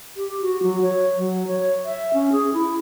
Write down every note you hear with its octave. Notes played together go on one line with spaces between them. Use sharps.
G4
F#4
F#3
C#5
F#3
C#5
E5
C#4
G#4
E4